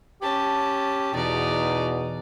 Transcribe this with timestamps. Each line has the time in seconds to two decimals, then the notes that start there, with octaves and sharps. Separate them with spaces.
0.22 C#4 G4 A5
1.14 E2 B2 D#4 D5